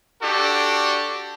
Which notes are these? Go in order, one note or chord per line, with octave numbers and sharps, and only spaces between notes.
D4 F#4 G4 A4